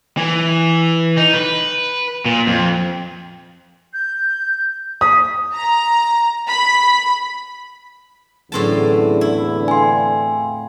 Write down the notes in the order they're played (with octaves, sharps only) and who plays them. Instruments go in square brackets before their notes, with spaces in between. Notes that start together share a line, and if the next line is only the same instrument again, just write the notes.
[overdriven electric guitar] E3
D#4
B4
A#2
F2
[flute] G6
[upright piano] D#6 [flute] B6
[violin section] A#5
B5
[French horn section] E2 D3 [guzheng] A2 C4 A5 [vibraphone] F#3 C#4 G#4
[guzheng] E4
[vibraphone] F5 G5 [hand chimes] G#5 C6